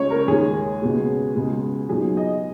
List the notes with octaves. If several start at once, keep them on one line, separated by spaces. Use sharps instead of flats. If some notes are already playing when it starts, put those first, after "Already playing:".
Already playing: C#2 C#3 G#3 C#5
A#4
D#2 D#3 G#3 G#4
C#2 B2 G#3
C#2 B2 G#3
B1 B2 F#3 G#4
D#5